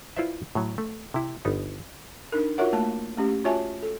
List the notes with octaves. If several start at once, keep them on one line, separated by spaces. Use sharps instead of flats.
E4 F4 B4 C5 D5 E5
A2 F#3
A3
C3 E4
G1 B3 D#4
D4 D#4 A#4
F4 F#4 A#4 C#5 E5 F#5
A3 A#3 A5
A3 C#4 G4
F4 F#4 C#5 E5 G#5 A5
A4